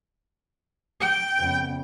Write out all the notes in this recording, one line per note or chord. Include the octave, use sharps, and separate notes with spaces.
G5
F2 C#3 B3